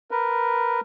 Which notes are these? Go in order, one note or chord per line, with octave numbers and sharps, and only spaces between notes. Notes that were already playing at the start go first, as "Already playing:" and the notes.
A#4 B4